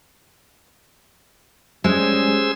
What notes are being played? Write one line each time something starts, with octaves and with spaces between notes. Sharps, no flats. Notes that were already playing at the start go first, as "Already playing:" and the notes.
G3 G#3 C#4 G#4 C5 E6